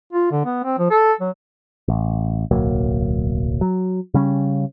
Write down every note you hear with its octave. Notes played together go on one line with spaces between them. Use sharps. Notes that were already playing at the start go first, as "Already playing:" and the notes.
F4
D3
B3
C4
F3
A4
F#3
A1
D1 B1 F#3 A#3
F#3
C#3 G3 C#4